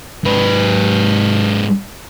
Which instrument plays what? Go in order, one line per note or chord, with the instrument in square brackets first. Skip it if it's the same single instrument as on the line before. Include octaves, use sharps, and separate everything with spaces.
[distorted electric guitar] G#2 B4